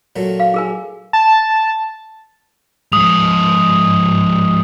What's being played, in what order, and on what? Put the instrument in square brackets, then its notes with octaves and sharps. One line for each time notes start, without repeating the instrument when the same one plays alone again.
[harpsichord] A#2 F#3 A3
[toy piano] F5
G#4 A#4 G#5
[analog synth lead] A5
[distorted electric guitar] G#2 F3 [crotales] D#6 F7